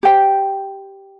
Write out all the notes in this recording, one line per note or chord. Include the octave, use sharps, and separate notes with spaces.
G4 C5 G5